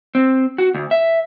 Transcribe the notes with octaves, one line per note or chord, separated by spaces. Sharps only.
C4
F#4
D2
E5